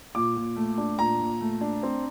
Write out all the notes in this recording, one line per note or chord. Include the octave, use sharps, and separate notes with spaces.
A#2 D6
A#2
A3
D4
A#2 A#5
A#2
A3
D4
C4